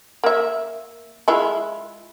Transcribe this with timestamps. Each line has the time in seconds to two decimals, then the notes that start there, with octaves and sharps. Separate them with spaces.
0.24 A#3 E5
1.28 G#3 E4 F4